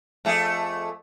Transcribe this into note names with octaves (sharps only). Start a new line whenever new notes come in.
F2 A3 G#4